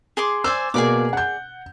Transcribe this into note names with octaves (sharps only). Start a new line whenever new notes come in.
G#4 C6 D6
C5 D5 G#5 E6
B2 A#3 G#4 D5 D6
F#5 G6